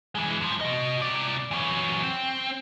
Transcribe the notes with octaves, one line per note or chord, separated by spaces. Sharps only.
E3 G#3
G2 F3
F#4 D#5
C3 D5
E3 F#3
C4